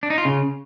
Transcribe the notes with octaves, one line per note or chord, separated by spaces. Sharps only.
D4
D#4
F4
C#3